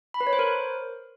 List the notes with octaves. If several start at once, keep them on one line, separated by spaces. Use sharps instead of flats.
B5
B4
C#5
C5
A#4